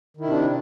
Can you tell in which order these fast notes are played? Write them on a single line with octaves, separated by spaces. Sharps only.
D#3 E4 C3 D4